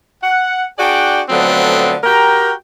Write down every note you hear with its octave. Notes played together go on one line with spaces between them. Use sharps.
F#5
D4 F#4 G#4 D5 G5
D3 F3 F#3 A3 B3 C4
F#4 G4 A#4 G5 A#5